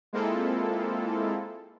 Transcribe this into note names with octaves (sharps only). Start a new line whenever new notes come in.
G#3 A#3 C4 E4 F4 A4